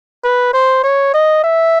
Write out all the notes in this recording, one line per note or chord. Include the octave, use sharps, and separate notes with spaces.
B4
C5
C#5
D#5
E5